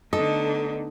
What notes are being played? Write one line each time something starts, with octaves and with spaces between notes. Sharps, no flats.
D3 A3 B3 D4 D#4 A4 D#5